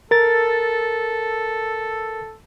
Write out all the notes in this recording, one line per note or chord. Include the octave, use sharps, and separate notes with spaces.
A4 A#4 A6